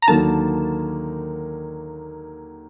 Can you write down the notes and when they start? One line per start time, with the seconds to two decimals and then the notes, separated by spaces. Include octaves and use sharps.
0.02 A#5
0.08 D#2 D3 F#3 A#3 D#4 A5